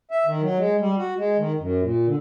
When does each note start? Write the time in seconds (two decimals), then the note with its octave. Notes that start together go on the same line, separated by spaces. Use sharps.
0.11 E5
0.26 D#3
0.42 F#3
0.58 G#3
0.81 G3
0.98 F#4
1.18 G#3
1.38 D#3
1.60 F#2
1.82 A#2
2.07 D3